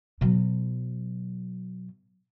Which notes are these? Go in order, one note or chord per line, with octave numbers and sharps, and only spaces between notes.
B2 F#3